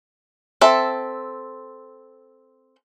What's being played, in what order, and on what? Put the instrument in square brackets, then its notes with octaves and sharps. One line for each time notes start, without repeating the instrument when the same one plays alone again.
[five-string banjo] C4 A4 E5